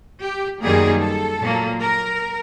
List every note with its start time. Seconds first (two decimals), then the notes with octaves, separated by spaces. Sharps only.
0.21 G4
0.60 F#2 D#3 G3 A#3 G#4
1.00 A4
1.41 A#2 F#3 A#3
1.80 A#4